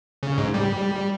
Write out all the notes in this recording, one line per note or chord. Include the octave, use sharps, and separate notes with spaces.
C#3
G#2
G3